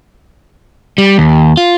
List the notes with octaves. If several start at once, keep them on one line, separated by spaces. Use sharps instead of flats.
G3
D#2
F4